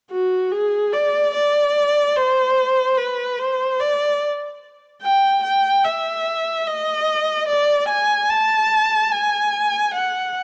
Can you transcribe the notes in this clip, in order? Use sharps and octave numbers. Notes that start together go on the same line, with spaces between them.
F#4
G#4
D5
D5
C5
B4
C5
D5
G5
G5
E5
D#5
D5
G#5
A5
G#5
F#5